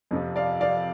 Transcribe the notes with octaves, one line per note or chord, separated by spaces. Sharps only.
F2 C3 F3
D5 F5
D5 F5